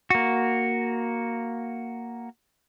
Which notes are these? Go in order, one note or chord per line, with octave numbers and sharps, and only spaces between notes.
A#3 F#4